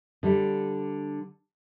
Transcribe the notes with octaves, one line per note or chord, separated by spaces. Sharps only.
D3 G3